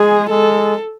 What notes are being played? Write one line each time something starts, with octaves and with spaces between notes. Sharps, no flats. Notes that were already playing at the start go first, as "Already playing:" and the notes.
Already playing: G#3 G#4
G#3 A4